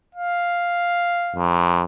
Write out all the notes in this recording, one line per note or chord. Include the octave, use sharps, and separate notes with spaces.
F5
F2